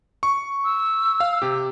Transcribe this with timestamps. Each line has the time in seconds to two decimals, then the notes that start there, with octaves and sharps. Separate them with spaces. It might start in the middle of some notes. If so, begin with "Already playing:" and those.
0.23 C#6
0.64 E6
1.20 F5
1.42 C3 G4